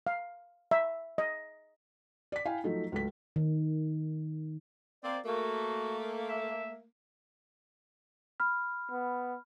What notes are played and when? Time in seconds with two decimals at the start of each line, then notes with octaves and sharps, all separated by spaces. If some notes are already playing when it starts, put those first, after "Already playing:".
0.07 F5
0.71 E5
1.18 D#5
2.32 D5 B6
2.45 E4 F5 G5 G#5
2.64 F3 F#3 A3 D#4
2.92 C#2 F#3 A3 B6
3.36 D#3
5.04 A#3 C4 D5
5.25 A3 A#3 F#4
6.28 E5
8.40 B5 F6
8.91 B3